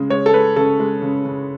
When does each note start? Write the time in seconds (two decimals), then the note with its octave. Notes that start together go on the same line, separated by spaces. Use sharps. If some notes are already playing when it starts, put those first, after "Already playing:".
Already playing: C#3 G#3
0.10 G#3 C#5
0.26 A4
0.33 G#3 B4
0.56 C#3 A4
0.80 G#3
1.02 C#3
1.25 C#3